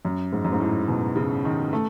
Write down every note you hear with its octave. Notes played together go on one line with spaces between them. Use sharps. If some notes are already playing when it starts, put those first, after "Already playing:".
F#2
G#2
F#2
G#2
A2
B2
C#3
D#3
A3